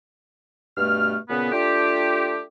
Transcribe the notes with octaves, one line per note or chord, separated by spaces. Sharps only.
G2 B2 A3 F6
A#2 C#3 B3
A3 D4 F4 G4